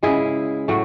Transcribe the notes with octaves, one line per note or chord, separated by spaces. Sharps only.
C#3 G#3 E4 G#4
A2 F#3 A3